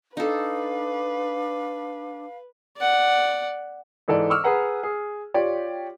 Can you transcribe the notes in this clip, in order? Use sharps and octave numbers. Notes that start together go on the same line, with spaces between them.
D4 D#4 A4 B4 F5
D5 F#5
G#2 E3 A4 D5
C#6 D6 E6 F6
G#4 B4 F#5 A#5
G#4
F4 G4 C#5 D5